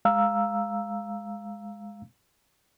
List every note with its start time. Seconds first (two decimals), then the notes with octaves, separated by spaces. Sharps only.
0.05 G#3 F5 A#5 E6